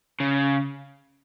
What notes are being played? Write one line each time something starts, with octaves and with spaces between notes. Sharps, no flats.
C#3